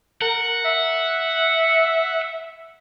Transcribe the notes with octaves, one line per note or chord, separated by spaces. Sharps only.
A#4 F#5
E5